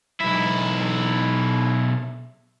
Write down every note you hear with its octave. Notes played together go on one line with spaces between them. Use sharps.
B1 E4